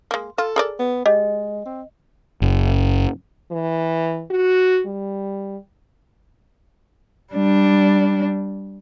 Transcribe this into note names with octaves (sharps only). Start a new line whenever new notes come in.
G#3 A#3
F4 A4
G#4 A#4 D5
B3
G#3 G4 D#5
C4
F#1
E3
F#4
G3
G3 D4